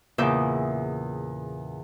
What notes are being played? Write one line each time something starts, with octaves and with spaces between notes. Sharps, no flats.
E2 A#2 C#3 E5 D6 G6